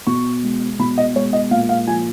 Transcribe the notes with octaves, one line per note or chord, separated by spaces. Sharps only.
B2 C#6
G#3
B2 B5
D#5
G#3 C#5
D#5
A#2 F5
F5
F3 G#5